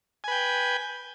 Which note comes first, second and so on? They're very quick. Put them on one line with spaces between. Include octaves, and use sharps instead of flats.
G#5 B4 G5